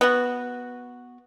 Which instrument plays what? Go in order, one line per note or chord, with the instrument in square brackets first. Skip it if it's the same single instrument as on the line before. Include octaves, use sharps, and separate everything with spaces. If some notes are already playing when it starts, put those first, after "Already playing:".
[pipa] B3 F#4